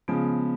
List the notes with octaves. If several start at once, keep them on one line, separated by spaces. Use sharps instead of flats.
C#3 F3 G#3 B3